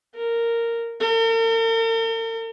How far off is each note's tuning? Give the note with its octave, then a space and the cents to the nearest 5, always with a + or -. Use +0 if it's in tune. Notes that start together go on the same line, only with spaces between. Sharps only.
A#4 -10
A#4 -45